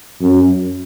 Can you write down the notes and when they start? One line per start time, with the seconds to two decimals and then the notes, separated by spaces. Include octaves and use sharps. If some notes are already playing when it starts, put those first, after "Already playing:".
0.22 F#2